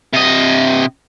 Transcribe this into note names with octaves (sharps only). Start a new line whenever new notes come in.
C3 D#5